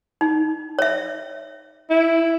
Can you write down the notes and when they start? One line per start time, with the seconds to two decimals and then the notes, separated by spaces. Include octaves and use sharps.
0.21 D#4
0.79 C#5 E5
1.90 E4